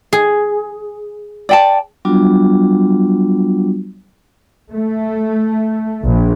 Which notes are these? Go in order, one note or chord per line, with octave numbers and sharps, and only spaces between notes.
G#4
D5 G5 A5
F#3 G3 B3 D4 F4 F#4
A3
A#1